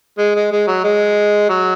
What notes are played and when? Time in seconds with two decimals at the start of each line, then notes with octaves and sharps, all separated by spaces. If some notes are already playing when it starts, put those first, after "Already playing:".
0.18 G#3
0.35 G#3
0.52 G#3
0.67 F#3
0.84 G#3
1.50 F#3